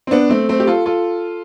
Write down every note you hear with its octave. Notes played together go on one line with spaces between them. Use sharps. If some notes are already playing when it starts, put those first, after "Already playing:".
C4
B3 D4
A3 C4
A3 C4
G4
F4 A4
F4 A4